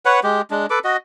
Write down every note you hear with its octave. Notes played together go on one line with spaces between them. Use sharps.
B4 C#5 F#5
G#3 G4
G#3 D4
A4 B4 D6
F#4 D#5